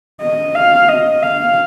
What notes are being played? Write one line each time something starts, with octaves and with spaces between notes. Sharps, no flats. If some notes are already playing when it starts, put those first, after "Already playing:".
D#5
F5
D#5
F5